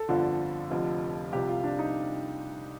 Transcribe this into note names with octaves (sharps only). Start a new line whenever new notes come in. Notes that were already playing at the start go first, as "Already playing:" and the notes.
Already playing: A4
G1 F2 D3 F3
F1 F2 D3 F3
C2 C3 F3 G4
F4
D4
D#4